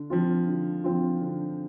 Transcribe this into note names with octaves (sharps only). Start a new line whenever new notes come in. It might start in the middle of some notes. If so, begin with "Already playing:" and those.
Already playing: D3
F3 C4 F4
D3
F3 C4 F4
D3